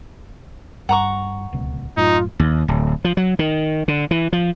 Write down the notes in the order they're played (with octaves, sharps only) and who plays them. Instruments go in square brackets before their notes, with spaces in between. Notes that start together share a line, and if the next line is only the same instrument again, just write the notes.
[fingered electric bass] G2 [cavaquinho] F#5 A#5 C#6
[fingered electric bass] D1 C#2 B2
[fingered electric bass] F#2 A2 [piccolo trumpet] D#4 [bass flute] F4
[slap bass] D#2
D1
F3
F#3
D#3
D3
E3
F3